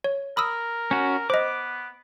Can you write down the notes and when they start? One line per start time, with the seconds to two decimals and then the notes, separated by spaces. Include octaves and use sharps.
0.04 C#5
0.37 A#4 B5 D#6 E6
0.91 C#4 F#4
1.30 B3 C5 D#5 D6